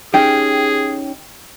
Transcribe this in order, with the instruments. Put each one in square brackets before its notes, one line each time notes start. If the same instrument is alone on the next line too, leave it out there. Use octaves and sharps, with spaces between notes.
[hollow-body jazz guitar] C#4 D#4 G4 [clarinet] G#4 [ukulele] G5